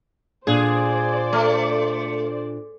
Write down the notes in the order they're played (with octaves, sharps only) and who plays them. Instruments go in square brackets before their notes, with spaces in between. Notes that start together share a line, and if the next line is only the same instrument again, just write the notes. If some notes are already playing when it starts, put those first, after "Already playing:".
[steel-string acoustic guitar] A#2 D4 [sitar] G#4 [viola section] C5 D5
[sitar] A3